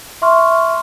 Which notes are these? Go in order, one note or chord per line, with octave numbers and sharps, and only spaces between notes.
E5 C6 C#6 F6